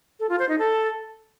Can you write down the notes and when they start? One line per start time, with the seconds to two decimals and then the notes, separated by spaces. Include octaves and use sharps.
0.20 A4
0.29 F4
0.39 C5
0.49 D#4
0.59 A4